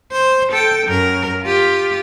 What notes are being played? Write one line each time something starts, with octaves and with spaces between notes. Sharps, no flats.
C5
A4 G5
F#2 A#4
F4 G4